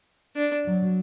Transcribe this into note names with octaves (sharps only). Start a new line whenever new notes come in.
D4
F#3